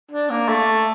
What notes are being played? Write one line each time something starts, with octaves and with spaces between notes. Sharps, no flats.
D4
A#3
A3